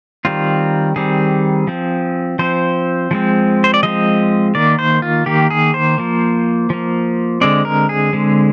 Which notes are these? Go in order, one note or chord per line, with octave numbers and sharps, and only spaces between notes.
D#3 G3 C4 F4
D#3 G3 C4 G#4
F3 C4
F3 C4 C5
F3 G#3 C4
C5
D5
F3 G#3 C4 D#5
D#3 A#3 D5
C5
F4
D#3 A#3 G4
G#4
C5
F3 A#3
F3 A#3
D3 G#3 C4 D5
A#4
G#4
D3 G#3 C4